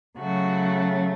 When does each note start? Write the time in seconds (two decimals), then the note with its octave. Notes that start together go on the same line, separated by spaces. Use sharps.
0.18 C#3 F#3 A3 F#4